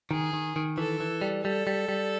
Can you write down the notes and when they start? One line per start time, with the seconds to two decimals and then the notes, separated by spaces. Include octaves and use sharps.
0.11 D#3 G#4
0.33 D#3
0.56 D#3
0.78 E3 A4
1.00 E3
1.21 G3
1.44 G3 A4
1.67 G3
1.89 G3